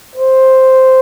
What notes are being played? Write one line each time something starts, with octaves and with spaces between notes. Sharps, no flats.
C5